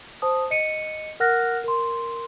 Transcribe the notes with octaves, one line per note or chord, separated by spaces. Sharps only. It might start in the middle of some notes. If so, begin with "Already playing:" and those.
C5 A5 D#6
D#5 C#7 D#7
A#4 F#5 F6 F#6 A#6
A#4 C6